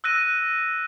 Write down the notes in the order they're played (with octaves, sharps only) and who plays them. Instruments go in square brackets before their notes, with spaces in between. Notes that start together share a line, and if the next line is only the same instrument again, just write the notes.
[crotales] E6 F#6 A#6 D#7